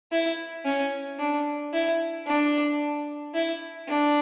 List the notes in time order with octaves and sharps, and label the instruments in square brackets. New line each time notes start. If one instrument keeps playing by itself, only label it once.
[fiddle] E4
C#4
D4
E4
D4
E4
D4